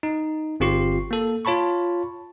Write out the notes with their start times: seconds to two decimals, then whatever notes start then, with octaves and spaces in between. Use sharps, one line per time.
0.03 D#4
0.60 G1 C4 F4 G4 C#6 C7
1.11 A#3 A4
1.45 F4 C#5 A5 B5 C#6